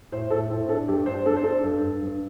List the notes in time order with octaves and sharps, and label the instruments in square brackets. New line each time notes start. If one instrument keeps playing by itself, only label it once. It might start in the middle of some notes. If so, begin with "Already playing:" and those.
[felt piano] A2 C5
A2 A4
A2 C5
D4 A4
G2 G4
D4 C5
D4 A4
C5
D4 A4
G2
G2
G2